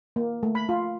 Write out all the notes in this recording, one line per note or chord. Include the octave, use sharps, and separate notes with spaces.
A#3
A3
B5
F4